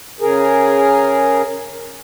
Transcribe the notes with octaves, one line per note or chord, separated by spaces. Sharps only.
C#3 G#4 A#4